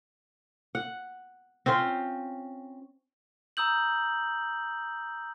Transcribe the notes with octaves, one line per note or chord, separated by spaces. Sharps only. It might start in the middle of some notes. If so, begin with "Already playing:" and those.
F#5
C4 C#4 F4 C5
A#5 D#6 E6 G6 F#7